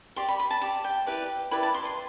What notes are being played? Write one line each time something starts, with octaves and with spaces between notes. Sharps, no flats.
G4 D5 C6
B5
B5
A5
G4 D5 A5
G5
E4 G4 B4 D5
E4 G4 B4 D5 B5
A5
C6
C6